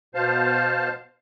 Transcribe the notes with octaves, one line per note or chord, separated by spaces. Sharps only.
B2 C5 F5 A5